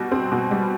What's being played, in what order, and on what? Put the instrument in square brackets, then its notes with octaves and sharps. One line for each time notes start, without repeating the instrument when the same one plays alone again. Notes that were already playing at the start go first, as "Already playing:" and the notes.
Already playing: [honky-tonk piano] B2 G3 F#4
C4
B2
G3